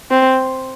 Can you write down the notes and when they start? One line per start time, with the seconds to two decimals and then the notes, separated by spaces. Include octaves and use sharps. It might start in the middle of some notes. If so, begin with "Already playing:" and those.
0.11 C4